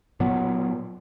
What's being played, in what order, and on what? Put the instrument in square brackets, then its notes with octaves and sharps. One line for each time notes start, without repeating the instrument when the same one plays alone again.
[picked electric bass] A#2 F#3 B3